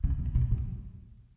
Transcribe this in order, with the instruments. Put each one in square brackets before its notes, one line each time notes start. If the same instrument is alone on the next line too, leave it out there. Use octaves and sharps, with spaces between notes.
[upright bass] C#3
B2
B2
A2